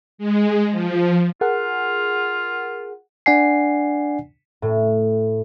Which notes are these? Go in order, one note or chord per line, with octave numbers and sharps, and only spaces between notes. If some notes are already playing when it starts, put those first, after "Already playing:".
G#3
F3
F4 G#4 A#4 F#5
D4 D5 F#5 G#5 C7
A2